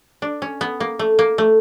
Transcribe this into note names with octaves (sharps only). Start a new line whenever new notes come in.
D4
C#4
B3
A#3
A3
A#3
A3